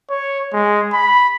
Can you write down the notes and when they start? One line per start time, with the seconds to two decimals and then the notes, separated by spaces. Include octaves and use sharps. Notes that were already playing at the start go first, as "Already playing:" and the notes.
0.10 C#5
0.53 G#3
0.93 B5